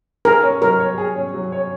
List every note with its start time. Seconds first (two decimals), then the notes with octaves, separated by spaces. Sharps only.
0.25 G#4 A#4
0.43 C#4
0.61 F#3 A#4
0.80 C#5
0.98 G#4
1.16 C#4
1.34 F#3
1.52 C#5